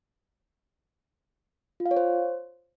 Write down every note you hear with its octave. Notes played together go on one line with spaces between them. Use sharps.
F4
F5
C#5
C5